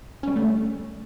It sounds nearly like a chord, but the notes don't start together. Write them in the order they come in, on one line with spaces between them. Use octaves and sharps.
C#4 G3 D3 A3